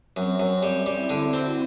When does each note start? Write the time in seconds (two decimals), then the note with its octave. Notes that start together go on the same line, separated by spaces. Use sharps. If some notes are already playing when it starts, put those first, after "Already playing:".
0.17 F#2 C4
0.40 F#2
0.63 G3
0.86 G3 E4
1.10 D3
1.21 F#4
1.33 C4